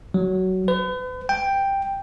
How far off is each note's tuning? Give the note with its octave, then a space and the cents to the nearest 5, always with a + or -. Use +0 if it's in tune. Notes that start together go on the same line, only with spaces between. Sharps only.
F#3 +15
B4 +40
G5 +5